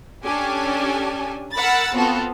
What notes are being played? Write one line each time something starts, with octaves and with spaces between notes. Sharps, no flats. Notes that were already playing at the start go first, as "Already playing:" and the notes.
C#4 D4 G4 A4 G#5
A#4 F#5 B5 E6 A6
B3 C4 F4 F#4 A4